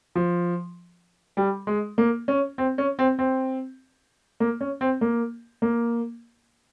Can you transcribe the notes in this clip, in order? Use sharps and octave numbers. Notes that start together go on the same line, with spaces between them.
F3
G3
G#3
A#3
C#4
C4
C#4
C4
C4
A#3
C#4
C4
A#3
A#3